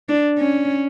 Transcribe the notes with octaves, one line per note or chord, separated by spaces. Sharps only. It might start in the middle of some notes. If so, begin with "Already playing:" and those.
D4
C#4